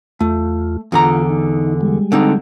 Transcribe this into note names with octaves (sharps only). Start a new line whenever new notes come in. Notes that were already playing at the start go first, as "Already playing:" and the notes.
E2 A3 F4
E2 D3 F4 A#5
D#4
G3 G#3
D3 C4 D#4